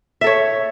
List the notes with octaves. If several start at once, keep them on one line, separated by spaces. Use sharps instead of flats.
A4 C#5 E5